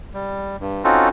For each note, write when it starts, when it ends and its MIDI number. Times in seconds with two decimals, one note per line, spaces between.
0.14 0.56 55
0.61 0.83 43
0.84 1.09 60
0.84 1.09 61
0.84 1.09 63
0.84 1.09 65
0.84 1.09 66
0.84 1.09 69